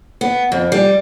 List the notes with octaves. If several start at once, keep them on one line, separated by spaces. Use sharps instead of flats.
B3
F2
G3